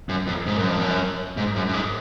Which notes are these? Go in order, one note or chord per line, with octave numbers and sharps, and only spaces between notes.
F#2
F2
G#2
F#2
F2
F#2
G#2
F#2
F#2
G#2